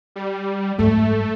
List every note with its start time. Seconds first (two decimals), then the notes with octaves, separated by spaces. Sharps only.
0.16 G3
0.78 F#1 G#2 A3